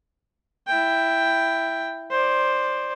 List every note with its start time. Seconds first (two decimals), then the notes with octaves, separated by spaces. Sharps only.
0.67 E4 G5
2.11 C5 D5